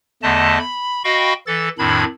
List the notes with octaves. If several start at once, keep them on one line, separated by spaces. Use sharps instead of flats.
E2 D3 A3 D#5 A5
B5
F#4 D#5 F5 G5 B5 C#6
E3 A4 A6
F2 A2 D#3 D4 B5 G#6